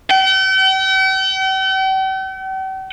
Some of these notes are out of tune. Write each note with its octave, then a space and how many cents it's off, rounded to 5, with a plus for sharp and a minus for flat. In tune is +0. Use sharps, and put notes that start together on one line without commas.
G5 -45